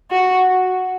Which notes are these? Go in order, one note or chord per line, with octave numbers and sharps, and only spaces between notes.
F#4